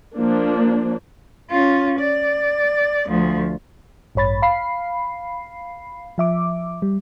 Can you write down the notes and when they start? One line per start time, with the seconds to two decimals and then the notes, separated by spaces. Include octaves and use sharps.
0.15 F3 A#3 D4
1.50 C#4 F4
1.99 D5
3.08 D2 F3
4.15 A1 G2 C#5 B5 A6
4.42 F5 B5 C7
6.18 F3 E5 D6
6.82 G3